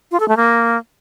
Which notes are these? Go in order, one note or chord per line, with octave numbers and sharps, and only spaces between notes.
F4
A4
A3
A#3